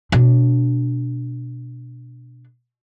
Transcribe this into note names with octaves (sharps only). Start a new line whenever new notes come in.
B2 D4